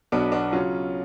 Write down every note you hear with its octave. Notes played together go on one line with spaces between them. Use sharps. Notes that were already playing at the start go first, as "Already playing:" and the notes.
B1 B2 F#3 B3 D4
D4 F#4
C#3 F#3 C#4 F4